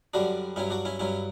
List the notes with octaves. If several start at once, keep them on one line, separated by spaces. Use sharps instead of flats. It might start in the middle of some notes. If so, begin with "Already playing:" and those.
F#2 D3 G3 D4 F#4
G2 F#3 C#4 E4
D4 F#4
C#4 E4
G2 F#3 C#4 E4